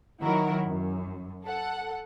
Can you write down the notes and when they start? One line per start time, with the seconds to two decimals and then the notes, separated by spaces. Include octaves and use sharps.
0.20 D#3 F#3 E4 F#4 A#4
0.66 F#2
1.44 A4 F#5